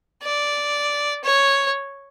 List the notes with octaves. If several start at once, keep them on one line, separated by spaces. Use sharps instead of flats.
D5
C#5